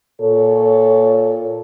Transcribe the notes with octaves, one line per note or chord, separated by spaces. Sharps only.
A#2 A4 C#5